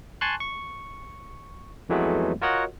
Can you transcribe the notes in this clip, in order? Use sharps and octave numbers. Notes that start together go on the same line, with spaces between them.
G#5 A5 C6 C#6 F#6
C#6
F2 E3 F#3 G#3 A3 B3
F4 F#4 A#4 C#5 D#5 F#5